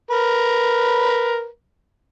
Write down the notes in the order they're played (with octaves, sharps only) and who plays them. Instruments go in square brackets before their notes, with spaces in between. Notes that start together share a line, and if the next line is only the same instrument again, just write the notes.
[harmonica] A#4 B4